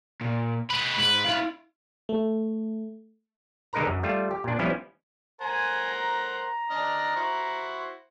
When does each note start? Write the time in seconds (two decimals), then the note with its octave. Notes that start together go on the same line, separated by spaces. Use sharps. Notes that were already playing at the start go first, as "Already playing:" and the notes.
0.21 A#2
0.70 G#3 B4 B5
0.98 G#2 B4
1.25 E4 F5
2.09 A3
3.73 D3 G#3 D#4 A#4 B4 A#5
3.86 F#2
4.03 G3 A3 F4
4.31 G4
4.44 A#2 D4
4.59 F3 G3 B3 C#4 E4
5.41 A#4 C5 F#5 G#5
5.87 A#5
6.71 D4 D#5 F6
7.16 E4 F#4 C5